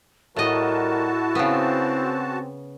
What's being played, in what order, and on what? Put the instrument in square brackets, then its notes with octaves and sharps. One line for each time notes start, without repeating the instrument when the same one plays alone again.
[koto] A2 D#5 [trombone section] G3 A#4 [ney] E4 [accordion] F#4 A5
[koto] C#3 B3 [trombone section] C4